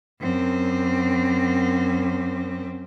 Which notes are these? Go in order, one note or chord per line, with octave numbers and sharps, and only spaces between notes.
F#2 C4